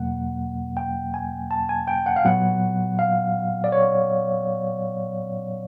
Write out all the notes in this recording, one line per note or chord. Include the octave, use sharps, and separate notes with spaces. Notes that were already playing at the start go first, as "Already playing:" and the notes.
Already playing: E2 B2 F#3 A#3 F#5
G5
G#5
A5
G#5
G5
F#5
F5
A#2 F#3 B3 F#5
F5
D5
C#5